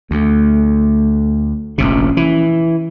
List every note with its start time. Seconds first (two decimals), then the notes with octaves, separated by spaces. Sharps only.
0.11 D2 A3
1.78 F1 A#1 C3 C#4
2.17 E3